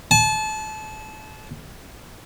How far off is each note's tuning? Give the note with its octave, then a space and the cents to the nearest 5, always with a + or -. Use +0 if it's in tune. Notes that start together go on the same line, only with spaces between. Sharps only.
A5 -30